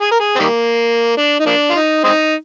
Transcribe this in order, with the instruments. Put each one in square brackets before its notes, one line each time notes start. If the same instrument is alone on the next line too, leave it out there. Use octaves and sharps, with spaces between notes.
[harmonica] G#4
A#4
G#4
C4
D#3 G3 A#3
D4
D#4
F3 A#3 D4
F4
D#4
G#3 C4 D#4